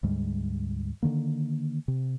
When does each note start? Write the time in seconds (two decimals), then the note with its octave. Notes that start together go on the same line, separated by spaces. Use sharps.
0.03 D2 G#2 G3 G#3
1.03 D3 D#3 A#3
1.88 C3